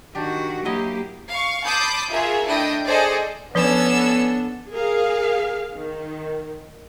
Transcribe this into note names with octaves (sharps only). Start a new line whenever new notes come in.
D#3 D4 F#4 G4
F#3 A#3 E4 G4 D#5
F5 C#6
A5 B5 C6 D6 D#6 G6
F4 F#4 G#4 A#4 E5
A3 D4 E4 D#5 G5
G#4 A4 C5 D5 D#5
F3 B3 C#4 D4 A4 B4 D5 E6
G#4 A#4 F5
D#3